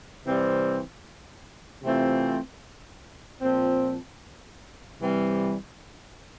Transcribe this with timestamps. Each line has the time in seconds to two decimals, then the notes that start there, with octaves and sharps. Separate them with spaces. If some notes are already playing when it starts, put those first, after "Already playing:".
0.25 C3 E3 G3 C4
1.83 C3 E3 A3 C4 F4
3.41 A#2 F3 C4
4.99 C3 E3 G3 C4